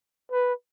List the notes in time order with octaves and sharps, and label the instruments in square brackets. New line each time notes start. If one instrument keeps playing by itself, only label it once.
[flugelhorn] B4